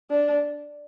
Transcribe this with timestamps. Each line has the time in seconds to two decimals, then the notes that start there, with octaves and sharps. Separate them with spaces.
0.10 D4